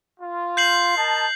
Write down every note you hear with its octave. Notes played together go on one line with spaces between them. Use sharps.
F4
G6 C7 F#7
A#4 D#5 A5